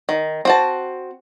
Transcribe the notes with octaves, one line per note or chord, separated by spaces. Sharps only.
D#3
C4 F#4 A5